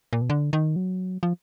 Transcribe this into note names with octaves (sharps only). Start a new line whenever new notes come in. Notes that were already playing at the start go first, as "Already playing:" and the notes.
A#2
B2
D3
D#3
F#3
F3